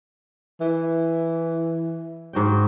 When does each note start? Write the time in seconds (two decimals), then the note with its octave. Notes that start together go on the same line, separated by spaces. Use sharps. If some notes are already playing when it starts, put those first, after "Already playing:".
0.61 E3
2.33 G#2 F#4 G5